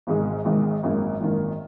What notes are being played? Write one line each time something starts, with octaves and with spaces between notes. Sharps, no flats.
G#1 G#2 D#3 G#3
G#1 G#2 D#3 G#3
G#1 F#2 D#3 A#3
G#1 F#2 D#3 A#3